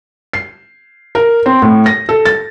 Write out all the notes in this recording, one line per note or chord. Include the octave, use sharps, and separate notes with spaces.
C7
A#4
C4
A2
A#6
A4
A6